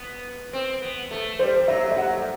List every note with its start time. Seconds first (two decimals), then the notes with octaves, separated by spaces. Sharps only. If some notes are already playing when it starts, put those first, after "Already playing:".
Already playing: B3
0.53 C4
0.82 B3
1.11 A3
1.39 G3 C5
1.57 G3
1.68 F#3 E5
1.88 G3
1.91 E5
1.97 F#3 F#5
2.18 G3